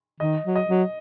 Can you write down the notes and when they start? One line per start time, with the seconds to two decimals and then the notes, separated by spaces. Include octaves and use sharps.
0.20 D#3 D#5
0.44 F#3
0.56 D#5
0.67 F#3